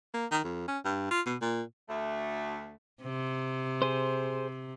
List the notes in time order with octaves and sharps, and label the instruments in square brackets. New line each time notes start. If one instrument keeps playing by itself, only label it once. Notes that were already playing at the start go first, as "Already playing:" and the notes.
[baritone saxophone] A#3
D#3
F2
C#4
G2
F4
B2
A#2
[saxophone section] D2 A3
[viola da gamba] C3
[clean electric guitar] G#4 C5